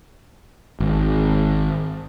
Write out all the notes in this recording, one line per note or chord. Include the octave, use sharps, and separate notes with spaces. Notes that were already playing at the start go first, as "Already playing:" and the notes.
G#1